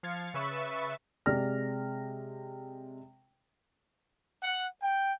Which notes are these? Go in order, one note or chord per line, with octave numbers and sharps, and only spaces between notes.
F3 F5 G#6 A6 C#7
C#3 B4 E5 C#6 A6 E7
C3 G#3 D5 F6 A#6
F#5
G5